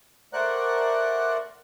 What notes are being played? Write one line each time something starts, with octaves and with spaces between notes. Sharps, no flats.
A3 A#4 C5 D5 F#5 F#6